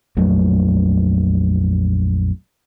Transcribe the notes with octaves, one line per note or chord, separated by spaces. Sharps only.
A#1 F2 F#3 A3